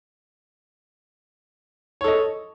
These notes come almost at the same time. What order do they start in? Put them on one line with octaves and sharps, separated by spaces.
C#5 A4 D#5